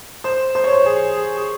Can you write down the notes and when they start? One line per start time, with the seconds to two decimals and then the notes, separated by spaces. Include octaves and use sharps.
0.24 C5
0.55 C5
0.64 C#5
0.73 C5
0.86 G#4
1.17 G#4
1.37 G#4